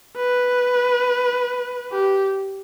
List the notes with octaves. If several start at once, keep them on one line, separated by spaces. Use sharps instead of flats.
B4
G4